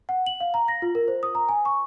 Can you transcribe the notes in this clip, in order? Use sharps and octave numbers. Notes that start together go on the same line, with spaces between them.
F#5
F#7
F5
A#5
A#6
F4
A#4
C5
D#6
A#5
G#5
C#6